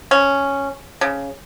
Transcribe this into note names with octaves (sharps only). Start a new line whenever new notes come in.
C#4
C#3